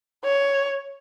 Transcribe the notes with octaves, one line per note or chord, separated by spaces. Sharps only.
C#5